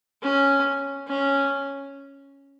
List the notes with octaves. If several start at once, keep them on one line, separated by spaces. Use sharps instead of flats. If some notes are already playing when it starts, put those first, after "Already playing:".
C#4
C#4